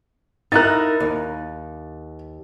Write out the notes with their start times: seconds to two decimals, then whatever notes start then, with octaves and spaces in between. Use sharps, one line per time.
0.52 D#4 E4 A#4 F#6 A6
1.00 D#2